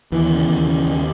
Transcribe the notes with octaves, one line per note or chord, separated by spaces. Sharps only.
D#2 E3
C#3
D#2
C#3
D#2